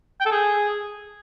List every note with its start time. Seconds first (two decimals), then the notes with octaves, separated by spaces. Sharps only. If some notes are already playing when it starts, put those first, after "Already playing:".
0.20 G5
0.26 A4
0.32 G#4